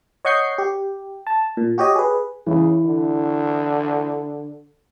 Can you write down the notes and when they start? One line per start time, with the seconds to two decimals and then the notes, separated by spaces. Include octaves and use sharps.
0.25 C#5 D#5 F#5 C#6 G6 C7
0.58 G4
1.27 A5
1.57 A#2
1.78 F#4 G4 C#5 D#5
1.96 G#4 B4
2.47 C#3 E3
2.85 D3